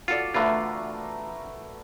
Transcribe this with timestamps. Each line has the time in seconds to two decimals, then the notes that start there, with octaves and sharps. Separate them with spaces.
0.08 F4 F#4 A4 D5
0.34 E2 D3 A3 F4 A#4 B4